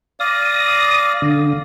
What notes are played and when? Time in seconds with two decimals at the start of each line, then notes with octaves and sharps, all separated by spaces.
0.20 D5 F5 D#6 A#6
1.22 D3